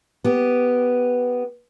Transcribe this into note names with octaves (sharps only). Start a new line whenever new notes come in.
B3 G4